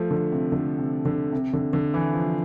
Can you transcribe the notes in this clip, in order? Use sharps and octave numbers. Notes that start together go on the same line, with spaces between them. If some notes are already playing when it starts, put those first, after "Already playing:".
Already playing: F3 A3
D3
C3
D3
C3
D3
C3
D3
D3
E3
F3